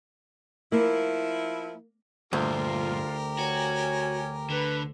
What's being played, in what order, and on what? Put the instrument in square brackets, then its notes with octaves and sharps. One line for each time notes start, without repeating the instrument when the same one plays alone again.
[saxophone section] F3 E4 [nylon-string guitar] A#3
[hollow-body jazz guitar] D2 [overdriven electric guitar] G2 A#2 [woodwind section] F4 [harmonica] G4 A#4
[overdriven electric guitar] F#4 [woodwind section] C#5 G#5
[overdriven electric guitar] D3 [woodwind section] B4